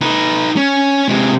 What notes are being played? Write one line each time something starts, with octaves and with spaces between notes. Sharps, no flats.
D#4 B4
C#4
C3 G#3